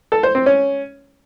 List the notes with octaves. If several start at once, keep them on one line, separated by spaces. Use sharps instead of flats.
A4
C5
C4
C#4